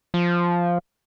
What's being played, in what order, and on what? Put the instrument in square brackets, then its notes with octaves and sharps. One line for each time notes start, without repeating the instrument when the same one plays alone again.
[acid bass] F3